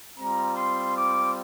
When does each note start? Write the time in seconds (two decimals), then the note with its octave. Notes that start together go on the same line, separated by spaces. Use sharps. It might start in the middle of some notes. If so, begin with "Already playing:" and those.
0.18 G3 C4 F4 A#5
0.57 C6
0.95 D6